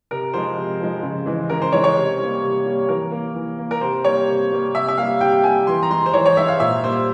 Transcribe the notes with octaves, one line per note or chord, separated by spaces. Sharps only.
C3 A#4
F3 G#3 C5
C3
F3 G#3
C#3
E3 G#3
C#3 A#4
C5
E3 G#3 C#5
C#5
C3
G3 A#3
C3
G3 A#3
E3 A#4
A#3
E3
A#3
A#4
C3 C5
G3 A#3 C#5
C3
G3 A#3
C3 E5
E5
G3 A#3 F5
C3 G5
G3 A#3 G#5
E3 C6
A#5
G#3 C6
C5
E3 C#5
C#5
G#3 E5
F5
A#2 E5
G3 A#3 C5